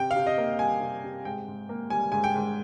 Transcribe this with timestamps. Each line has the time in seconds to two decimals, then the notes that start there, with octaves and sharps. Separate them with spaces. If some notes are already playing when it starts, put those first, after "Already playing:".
Already playing: C3 G5
0.11 F5
0.16 C3
0.27 D#5
0.38 A#3
0.59 G3 G#5
0.81 C3
1.04 C3
1.25 G#2 G5
1.48 G#2
1.69 A#3
1.90 G3 G#5
2.12 G#2 G#5
2.24 G5
2.35 G#2